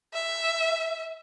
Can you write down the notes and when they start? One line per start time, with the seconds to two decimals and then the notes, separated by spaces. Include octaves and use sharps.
0.14 E5